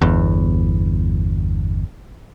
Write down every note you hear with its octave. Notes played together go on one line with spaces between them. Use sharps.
G1 E2